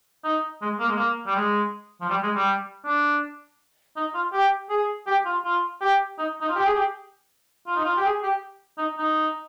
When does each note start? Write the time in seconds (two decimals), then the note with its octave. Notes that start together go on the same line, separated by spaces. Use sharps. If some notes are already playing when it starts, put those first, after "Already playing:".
0.24 D#4
0.62 G#3
0.80 A#3
0.88 G#3
0.96 A#3
1.26 G3
1.36 G#3
2.01 F3
2.09 G3
2.23 G#3
2.35 G3
2.84 D4
3.96 D#4
4.14 F4
4.33 G4
4.70 G#4
5.07 G4
5.25 F4
5.45 F4
5.81 G4
6.18 D#4
6.41 D#4
6.49 F4
6.55 G4
6.65 G#4
6.75 G4
7.67 F4
7.76 D#4
7.85 F4
7.97 G4
8.05 G#4
8.23 G4
8.78 D#4
8.98 D#4